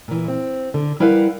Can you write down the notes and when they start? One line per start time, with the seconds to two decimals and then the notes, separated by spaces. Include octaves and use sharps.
0.08 A#2 E3
0.28 C4
0.74 D3
1.00 G3 E4 A#4 B4 F5 F#5